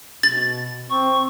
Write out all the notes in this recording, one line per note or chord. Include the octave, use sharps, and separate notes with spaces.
B2 A6
C4 C#6